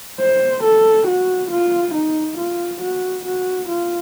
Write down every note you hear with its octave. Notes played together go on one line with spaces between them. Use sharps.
C5
A4
F#4
F4
D#4
F4
F#4
F#4
F4